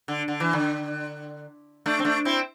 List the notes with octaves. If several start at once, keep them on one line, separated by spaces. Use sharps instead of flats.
D3
D3
E3
D3
A3 D4
C4
A3 D4
C4 E4